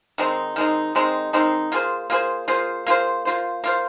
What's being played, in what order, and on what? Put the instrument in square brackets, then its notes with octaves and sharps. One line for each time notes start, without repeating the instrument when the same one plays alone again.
[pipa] D#3 G#3 C4 D#4
D#3 G#3 C4 D#4
D#3 G#3 C4 D#4
D#3 G#3 C4 D#4
A#3 F4 G#4 C5
A#3 F4 G#4 C5
A#3 F4 G#4 C5
A#3 F4 G#4 C5
A#3 F4 C5
A#3 F4 C5